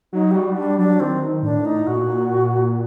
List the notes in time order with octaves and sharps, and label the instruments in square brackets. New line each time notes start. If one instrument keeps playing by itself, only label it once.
[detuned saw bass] F#3 [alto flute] D#4
[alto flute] G4
[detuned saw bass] G3 [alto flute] F#4
[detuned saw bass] G3 [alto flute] D4
[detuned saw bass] F#3 [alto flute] D4
[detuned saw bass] D#3 [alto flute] C4
[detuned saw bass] A2 [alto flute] D4
[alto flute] D#4
[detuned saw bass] A#2 [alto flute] F#4